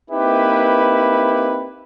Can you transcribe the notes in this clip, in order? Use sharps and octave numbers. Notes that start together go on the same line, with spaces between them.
A#3 C4 D#4 E4 G4 B4